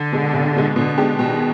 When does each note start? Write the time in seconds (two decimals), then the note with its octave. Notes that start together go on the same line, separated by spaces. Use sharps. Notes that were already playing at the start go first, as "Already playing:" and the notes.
Already playing: D3
0.12 B2 G#3
0.33 C2
0.56 B2 G#3
0.76 B2 D3
0.98 G#3 D4 G4
1.19 B2 D#3